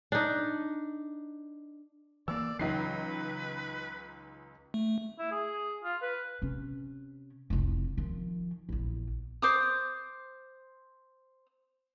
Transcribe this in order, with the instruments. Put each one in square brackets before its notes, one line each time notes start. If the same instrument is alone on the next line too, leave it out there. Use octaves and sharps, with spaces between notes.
[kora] D4 D#4
[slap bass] E3 A#3 [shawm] D5 [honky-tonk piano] E6
[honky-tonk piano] C#2 D#4 C7 [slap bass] E3 F#3 [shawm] B4
[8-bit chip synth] A3
[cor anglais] E4
G#4
F4
B4
[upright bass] C3 C#4
F1 C2
D#3 F3
A#1 E2
[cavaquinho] C5 D6 D#6